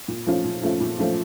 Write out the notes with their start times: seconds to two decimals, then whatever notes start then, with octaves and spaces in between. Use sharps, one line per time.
0.08 A#2
0.26 F3 A3 C#4 F4
0.44 A#2
0.62 F3 A3 C#4 F4
0.80 A#2
0.98 F3 A3 C#4 F4